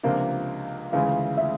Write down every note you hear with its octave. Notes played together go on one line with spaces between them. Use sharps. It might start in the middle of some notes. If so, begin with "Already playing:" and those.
C#2 C3 F3 A#3 D4 F5
D2 C#3 E3 G#3 F5
E5